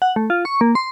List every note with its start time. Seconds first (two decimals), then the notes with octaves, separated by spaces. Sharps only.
0.02 F#5
0.16 A3
0.30 F4
0.45 C#6
0.61 A#3
0.75 C6